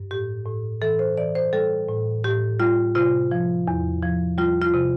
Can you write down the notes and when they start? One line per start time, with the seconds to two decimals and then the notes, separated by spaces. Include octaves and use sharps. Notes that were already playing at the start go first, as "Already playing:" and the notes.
Already playing: G2
0.11 A2 G4
0.46 A2
0.82 E3 A4
0.99 C5
1.18 E3 D5
1.35 C5
1.53 G3 A4
1.88 A2
2.24 A2 G4
2.60 G3 F4
2.95 C3 F4
3.31 F3
3.68 E2
4.03 F3
4.38 G3 F4
4.62 F4
4.74 C3